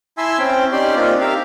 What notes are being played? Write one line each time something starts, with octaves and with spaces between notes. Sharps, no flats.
E4 E5 G#5 A5 C6 E6
C4 C#4 G5
C#4 D#4 G4 D5 G5 C6
A#3 C4 D4 D#4 F4
G4 A#4 E5 F5